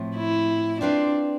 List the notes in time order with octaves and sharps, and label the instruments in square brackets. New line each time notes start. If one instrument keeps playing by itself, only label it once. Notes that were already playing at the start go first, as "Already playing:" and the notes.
Already playing: [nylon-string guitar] A2 F3 C4
[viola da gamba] E4
[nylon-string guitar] C4 F4 B4 F5 [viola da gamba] D4